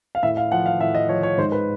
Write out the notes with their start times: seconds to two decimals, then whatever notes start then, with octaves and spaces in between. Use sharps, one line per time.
0.15 F5
0.23 A2 E5
0.37 F5
0.52 F3 F#5
0.66 F5
0.80 A2 E5
0.95 D#5
1.09 F3 C#5
1.23 C#5
1.38 G#2 C5
1.52 B4